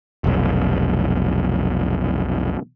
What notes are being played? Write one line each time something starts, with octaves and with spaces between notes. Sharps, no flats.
F1 B1